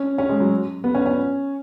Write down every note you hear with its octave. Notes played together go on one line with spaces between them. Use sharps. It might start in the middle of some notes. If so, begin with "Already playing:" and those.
Already playing: C#4
C#4
G#3
F#3
B3
C#4
C#4